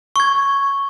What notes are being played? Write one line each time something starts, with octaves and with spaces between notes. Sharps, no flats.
C#6 G#6